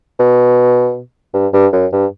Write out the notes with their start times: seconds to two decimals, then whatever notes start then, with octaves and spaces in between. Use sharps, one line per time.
0.19 B2
1.34 G2
1.53 G2
1.73 F#2
1.92 G2